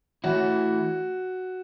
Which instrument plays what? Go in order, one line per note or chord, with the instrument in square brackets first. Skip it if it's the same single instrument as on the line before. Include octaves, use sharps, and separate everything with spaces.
[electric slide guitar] E3 A3 E4 C#5 [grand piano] F#4